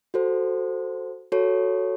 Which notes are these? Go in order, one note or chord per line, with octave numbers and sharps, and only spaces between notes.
F#4 A4 C5
F#4 A4 C#5